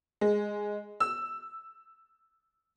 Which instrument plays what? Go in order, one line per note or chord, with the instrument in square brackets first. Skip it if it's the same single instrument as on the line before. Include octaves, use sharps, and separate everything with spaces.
[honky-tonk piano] G#3
E6